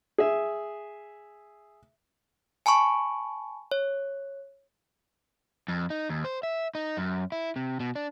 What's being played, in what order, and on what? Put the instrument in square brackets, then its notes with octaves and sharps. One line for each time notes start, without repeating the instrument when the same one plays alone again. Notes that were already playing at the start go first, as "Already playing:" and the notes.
[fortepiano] G#4 E5
[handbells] G#5 A5 B5 C#6
C#5
[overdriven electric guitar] F2
D#4
D#2
C5
E5
D#4
F#2
E4
C3
B2
D4